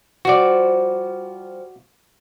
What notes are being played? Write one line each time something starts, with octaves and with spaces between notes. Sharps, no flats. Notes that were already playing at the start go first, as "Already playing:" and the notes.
F3 G3 F#4 D5